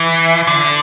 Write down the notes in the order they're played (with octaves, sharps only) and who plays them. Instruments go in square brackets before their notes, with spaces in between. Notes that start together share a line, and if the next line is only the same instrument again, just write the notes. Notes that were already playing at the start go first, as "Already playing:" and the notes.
Already playing: [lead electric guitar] E3
D3